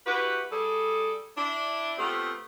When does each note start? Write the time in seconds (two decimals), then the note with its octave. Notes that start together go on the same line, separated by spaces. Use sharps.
0.06 E4 F#4 G4 B4
0.52 G3 G#4 A4
1.37 D4 E4
1.98 A3 B3 C4 F4 G4